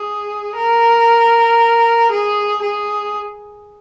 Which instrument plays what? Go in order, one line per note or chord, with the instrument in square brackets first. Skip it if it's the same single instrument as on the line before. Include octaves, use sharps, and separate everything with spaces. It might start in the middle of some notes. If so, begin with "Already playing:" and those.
Already playing: [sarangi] G#4
A#4
G#4
G#4